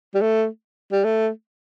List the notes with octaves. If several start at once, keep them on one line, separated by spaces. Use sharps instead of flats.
G3
A3
G3
A3